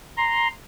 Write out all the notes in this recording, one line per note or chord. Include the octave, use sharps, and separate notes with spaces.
A#5 C6